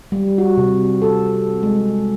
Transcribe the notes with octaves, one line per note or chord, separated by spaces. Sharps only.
G3
F#4
C3
A4
G#3